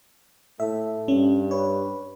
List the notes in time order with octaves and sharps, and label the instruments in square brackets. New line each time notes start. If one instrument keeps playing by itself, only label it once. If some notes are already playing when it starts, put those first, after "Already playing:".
[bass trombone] A2 [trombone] A3 [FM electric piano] E5
[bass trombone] G2 [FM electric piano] C#4
[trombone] B4 [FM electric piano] C#5